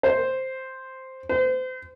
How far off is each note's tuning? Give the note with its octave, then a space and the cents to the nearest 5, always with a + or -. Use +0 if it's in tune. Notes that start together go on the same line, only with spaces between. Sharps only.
C5 +0
C5 -35